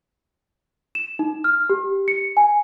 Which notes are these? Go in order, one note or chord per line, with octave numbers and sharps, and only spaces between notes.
E7
D#4
F6
G4
C#7
G#5